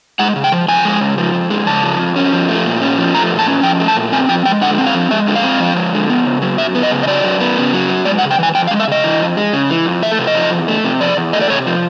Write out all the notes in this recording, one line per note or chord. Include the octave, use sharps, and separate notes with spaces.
G#3 F#5
C#3
G5
F3
F2 G#5
G#3
C#3
F3
F2
G#3
C#3 A5
F3
F2
C#4
F3
A3
A#2
C#4
F3
A3 A#5
A#2
A5
C#4
F3 G5
A3
A5
A#2
C4 G#5
F3 G5
G#3 G5
D3 F#5
C4
F5
F3
G#3 E5
D3
F5
C4
F3
G#3
D3
B3
C#3
F#3
F#2 E5
B3
D#5
C#3
D#5
F#3 D5
F#2
B3
C#3
F#3
F#2
G#3 D5
F#5
C#3
G5
E3 G#5
F2 G5
F5
G#3
E5
C#3 D#5
E3
F2
G#3
C#3
E3
F2
A3 E5
C3
D#5
F3
E2
A3
C3
F3 D5
E2
A3 D#5
D5
C3 C#5
F3